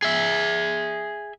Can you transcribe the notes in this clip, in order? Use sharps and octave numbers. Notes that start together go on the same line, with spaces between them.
G#4 E5